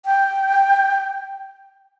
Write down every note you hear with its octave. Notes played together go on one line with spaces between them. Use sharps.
G5